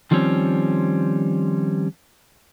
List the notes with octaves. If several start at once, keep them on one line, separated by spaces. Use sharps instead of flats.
D#3 F3 G3 C4 C#4